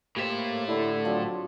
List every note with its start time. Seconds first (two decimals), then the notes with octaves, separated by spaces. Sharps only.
0.16 A2 A#3 G4 C5 E5
0.68 D3 E4
1.05 F3 F#3 C4 D4